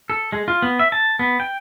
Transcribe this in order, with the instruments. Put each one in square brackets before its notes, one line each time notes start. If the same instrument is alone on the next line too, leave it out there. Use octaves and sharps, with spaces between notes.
[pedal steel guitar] A4
G#3
F4
B3
E5
A5
B3
G5